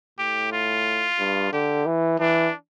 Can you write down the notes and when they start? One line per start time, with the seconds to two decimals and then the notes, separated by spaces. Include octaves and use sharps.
0.19 A2 G4
0.52 F4
1.19 G2
1.53 D3 G4
1.86 E3
2.20 E3 D4